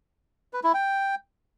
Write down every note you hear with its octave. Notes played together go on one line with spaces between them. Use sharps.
B4
E4
G5